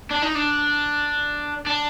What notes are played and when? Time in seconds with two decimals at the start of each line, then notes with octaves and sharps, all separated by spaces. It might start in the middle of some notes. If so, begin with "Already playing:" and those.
0.11 D4
0.22 D#4
0.35 D4
1.67 D4